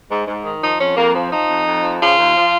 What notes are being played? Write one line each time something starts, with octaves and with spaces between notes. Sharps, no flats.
G#2
G#2
D#3
F3 D#4
F2 C#4
F2 A#3
F3
F3 D#4
F2
F2
F3
C#3 F4
D#2
F3